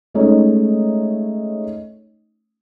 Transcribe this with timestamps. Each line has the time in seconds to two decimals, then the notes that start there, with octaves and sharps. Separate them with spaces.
0.14 G#3 A3 C#4 D#4 C#5 D#5